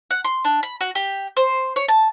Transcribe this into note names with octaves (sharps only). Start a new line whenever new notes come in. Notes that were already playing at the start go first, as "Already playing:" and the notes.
F#5
C6
D4
B5
F#4
G4
C5
C#5
A5